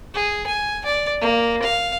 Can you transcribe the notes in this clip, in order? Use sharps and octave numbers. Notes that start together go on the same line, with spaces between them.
G#4
G#5
D5
A#3
F5